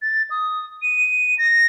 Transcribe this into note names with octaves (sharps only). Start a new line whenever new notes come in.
A6
D#6
D#7
A#6